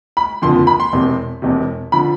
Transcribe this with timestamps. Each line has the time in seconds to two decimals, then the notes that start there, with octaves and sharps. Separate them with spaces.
0.17 B5
0.42 F#1 F2 D3 F3 C6
0.67 B5
0.80 C6
0.92 E1 E2 C3
1.42 E1 E2 C3
1.92 D3 F3 B5